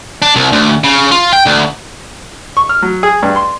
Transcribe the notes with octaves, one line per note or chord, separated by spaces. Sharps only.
D4
C2
D2
C#3
F4
G5
D2
C#6
F6
F#3
G#4
G2
C6